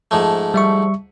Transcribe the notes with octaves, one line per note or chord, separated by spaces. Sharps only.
G#2 F3 A3
G3 E5 C#6